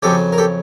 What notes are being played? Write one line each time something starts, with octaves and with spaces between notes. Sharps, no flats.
F2 C#3 F#3 G4 A4
A#4
G4 A4